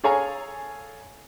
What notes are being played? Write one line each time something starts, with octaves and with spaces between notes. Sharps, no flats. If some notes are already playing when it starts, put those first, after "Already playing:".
G#4 A4 C#5 F5 G#5 A#5